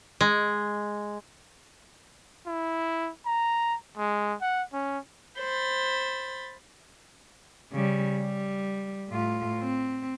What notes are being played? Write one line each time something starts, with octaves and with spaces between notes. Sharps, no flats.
G#3
E4
A#5
G#3
F#5
C#4
C5 B5 A6
C#3 G3
G3
A2 F4
C4